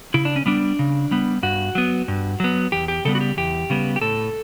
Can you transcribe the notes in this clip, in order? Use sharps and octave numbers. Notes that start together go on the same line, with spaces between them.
C#3 E4
D4
C#4
G3 B3 D4
C#3
G3 B3
G2 F#4
F#3 B3
G2
F#3 B3
E2 G4
G4
C#3 G3 B3 A4
F#4
G4
E2 G4
C#3 G3 B3
G4
A2 A4